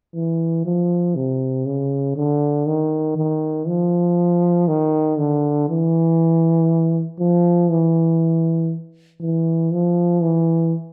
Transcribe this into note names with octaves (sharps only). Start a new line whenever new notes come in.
E3
F3
C3
C#3
D3
D#3
D#3
F3
D#3
D3
E3
F3
E3
E3
F3
E3